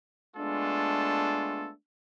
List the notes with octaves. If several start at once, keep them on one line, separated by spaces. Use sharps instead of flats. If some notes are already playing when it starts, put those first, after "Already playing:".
G#3 A3 B3 D4 F4 A4